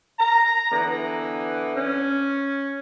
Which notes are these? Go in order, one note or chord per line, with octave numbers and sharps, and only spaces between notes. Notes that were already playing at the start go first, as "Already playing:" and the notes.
A#5
D3 E3 B3
C#4